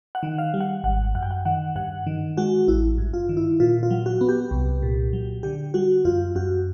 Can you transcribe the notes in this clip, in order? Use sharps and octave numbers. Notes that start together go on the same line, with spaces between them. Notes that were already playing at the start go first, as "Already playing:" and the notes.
F#5
D#3
F5
G3
F#5
G#1 F#5
F#2 F#5
G5
F#5
D#3 F#5
G2 F#5
D#3
G#3 F#4
A1 E4
G2
F4
D#3
E4
A#2 F4
F4
F#3
F#4
B3
G4
C2
A#2
F#3
D3 G4
G3 F#4
F#2 F4
F#2 F#4